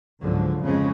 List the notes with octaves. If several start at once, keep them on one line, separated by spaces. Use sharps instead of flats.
C#2 G#2 D3 F3 F#3
F2 C#3 F3 G#3 C4 C#4